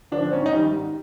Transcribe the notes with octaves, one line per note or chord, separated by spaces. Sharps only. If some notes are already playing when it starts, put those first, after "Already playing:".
D3 F3 D4
C4
G#2 C#4
D#4
D#3 G3
G#2